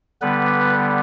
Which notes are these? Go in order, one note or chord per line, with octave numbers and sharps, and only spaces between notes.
D3 G3 B3 B4